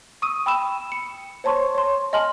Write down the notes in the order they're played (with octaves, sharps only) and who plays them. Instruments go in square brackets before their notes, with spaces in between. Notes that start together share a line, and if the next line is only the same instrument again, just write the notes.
[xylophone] C#6 D#6 E6 D#7
G5 B5 E6 E7
C#7
C5 C#5 A5 C6 C#6
C#5 C6
D#5 G#5 A5 C6 F6 F#7